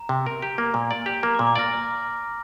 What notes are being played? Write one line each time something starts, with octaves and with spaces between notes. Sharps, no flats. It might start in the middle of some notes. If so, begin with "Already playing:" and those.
Already playing: A#5
C3
A#4
G4
A#3
A#2
D5
G4
A#3 A#5
D6
A#2
D6
D5 F6 A#6